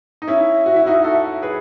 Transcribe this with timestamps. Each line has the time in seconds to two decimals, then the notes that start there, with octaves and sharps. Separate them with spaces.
0.22 D#4
0.28 C#4 E4 E5
0.66 F#4
0.76 E4
0.86 D#4 F#4
1.04 F#4 A4
1.42 G#4 B4